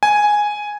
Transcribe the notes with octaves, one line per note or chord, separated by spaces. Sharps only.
G#5